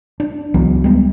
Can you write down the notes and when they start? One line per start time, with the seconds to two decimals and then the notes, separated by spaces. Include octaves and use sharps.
0.20 D4
0.54 C#2 E3 F#3 B3
0.84 G3 G#3 B3